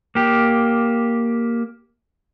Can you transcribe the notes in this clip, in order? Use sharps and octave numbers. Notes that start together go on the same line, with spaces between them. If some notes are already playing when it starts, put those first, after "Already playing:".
A#3 G4